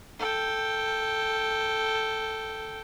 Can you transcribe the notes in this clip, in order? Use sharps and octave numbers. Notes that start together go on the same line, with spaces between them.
A4 G5